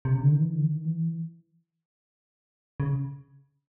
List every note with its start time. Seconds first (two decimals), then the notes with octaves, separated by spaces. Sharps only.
0.05 C3
0.14 C#3
0.23 D3
0.32 D#3
0.40 E3
0.54 D3
0.63 D#3
0.85 E3
2.80 C#3